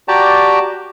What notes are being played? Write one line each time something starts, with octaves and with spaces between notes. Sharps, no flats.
F#4 G4 D5 G5 A5 A#5